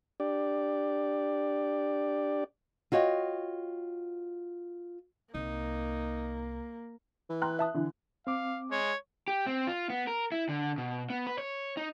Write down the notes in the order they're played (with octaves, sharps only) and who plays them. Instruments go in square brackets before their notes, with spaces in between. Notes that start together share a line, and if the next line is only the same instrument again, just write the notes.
[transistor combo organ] D4 G4 D5
[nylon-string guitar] F4 F#4 C#5 D#5 G5
[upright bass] C2 [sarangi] A#3 [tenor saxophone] D#4
[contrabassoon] E3
[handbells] G5 A#5 C6 [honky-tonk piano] F#6
[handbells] E5 A5 D#6
[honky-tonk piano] D3 E3
[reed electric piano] C4 D6 [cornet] F5
[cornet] G#3 [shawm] C#5
[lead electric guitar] G4
C4
F4
B3
A#4
E4
D3
B2
B3
B4
C#5
D#4